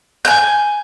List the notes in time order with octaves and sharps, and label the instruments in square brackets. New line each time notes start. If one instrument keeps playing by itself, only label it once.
[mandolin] G#5 G6